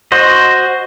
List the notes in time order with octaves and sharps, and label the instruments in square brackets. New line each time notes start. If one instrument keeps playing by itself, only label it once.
[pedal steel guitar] F#4 C5 D#5